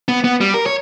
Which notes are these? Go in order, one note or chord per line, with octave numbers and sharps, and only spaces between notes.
B3
B3
G3
A#4
C#5